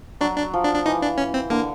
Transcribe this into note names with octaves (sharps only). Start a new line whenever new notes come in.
F#3 D4
D4
F3
D4
D4
E3 D#4
D4
C#4
C4
D3 A#3